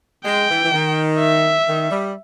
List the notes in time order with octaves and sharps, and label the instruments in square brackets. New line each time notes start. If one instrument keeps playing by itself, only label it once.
[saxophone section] G#3 [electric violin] G5
[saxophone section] E3
E3
D#3
[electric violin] E5
[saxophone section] D#3
G3